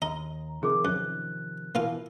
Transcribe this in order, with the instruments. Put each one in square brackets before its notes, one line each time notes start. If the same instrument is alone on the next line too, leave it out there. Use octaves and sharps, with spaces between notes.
[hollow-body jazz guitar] D#2 [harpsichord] D#5 [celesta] A#5
[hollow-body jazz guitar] C3 D#3 F3 [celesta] G#4 A#4 D6
[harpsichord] F#2 [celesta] F#6
[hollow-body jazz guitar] B2 E3 [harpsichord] A#3 F4 F5